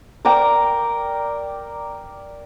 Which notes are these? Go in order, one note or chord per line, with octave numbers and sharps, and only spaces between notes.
A#4 D5 G5 A#5